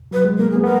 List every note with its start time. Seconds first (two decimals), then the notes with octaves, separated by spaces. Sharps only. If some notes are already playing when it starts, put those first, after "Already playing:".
0.11 F#3 B4
0.25 G#3
0.38 A#3 A#4
0.51 B3 G#4
0.63 B3 A#4